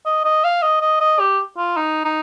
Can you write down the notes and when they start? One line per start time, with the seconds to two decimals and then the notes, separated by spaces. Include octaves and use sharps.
0.05 D#5
0.24 D#5
0.44 F5
0.62 D#5
0.81 D#5
1.01 D#5
1.20 G4
1.57 F4
1.77 D#4
2.05 D#4